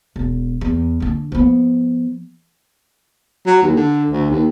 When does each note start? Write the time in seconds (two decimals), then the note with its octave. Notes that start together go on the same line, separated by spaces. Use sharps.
0.16 E1
0.61 E2
1.00 D3 D4
1.32 F3 B3
3.46 F#3
3.62 D#2
3.76 D3
4.09 D2
4.30 D#2